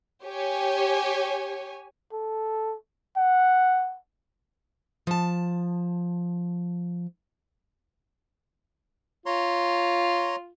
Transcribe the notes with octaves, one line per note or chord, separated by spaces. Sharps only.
G4 C#5 G#5
A4
F#5
F3 A5
F4 C#5 A#5 C6